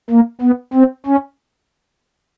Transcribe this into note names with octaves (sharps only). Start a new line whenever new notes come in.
A#3
B3
C4
C#4